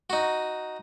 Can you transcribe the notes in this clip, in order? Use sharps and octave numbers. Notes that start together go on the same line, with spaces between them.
D#4 F#4